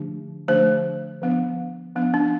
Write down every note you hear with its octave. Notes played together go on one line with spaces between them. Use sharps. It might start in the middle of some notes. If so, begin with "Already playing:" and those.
Already playing: D3 F3 A3 D4
D3 F3 A3 D4 C5
F3 B3 D4
F3 B3 D4
D4